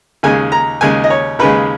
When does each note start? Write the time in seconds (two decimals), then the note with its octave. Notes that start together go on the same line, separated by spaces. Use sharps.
0.23 D#2 C#3 G#3 G#5
0.52 A#5
0.81 D#2 C#3 G#3 G#5
1.04 D#5
1.10 C#5
1.39 D#2 C#3 G#3 B4